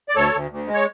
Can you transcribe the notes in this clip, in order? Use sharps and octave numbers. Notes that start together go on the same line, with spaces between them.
D5
D2 A4 C#5
D2
D2
G#3
C#5